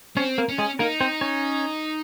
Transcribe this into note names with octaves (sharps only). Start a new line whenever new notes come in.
C4 C#4 C#5
A#3 A#4
C#4
G#3 G#4
A#3 D#4 A#4
C4 C5
C#4 C#5